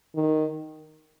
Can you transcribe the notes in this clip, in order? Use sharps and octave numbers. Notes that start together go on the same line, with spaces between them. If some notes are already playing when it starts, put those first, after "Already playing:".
D#3